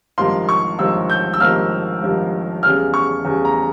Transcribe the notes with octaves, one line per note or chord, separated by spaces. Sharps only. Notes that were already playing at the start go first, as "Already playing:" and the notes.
G#1 G2 F3 A#3 C6
C#6
G#1 G2 F3 A#3 E6
G6
E6
G#1 G2 F3 A#3 F6
G#1 G2 F3 A#3
E2 C#3 G3 F6
C#6
E2 C#3 G3
A#5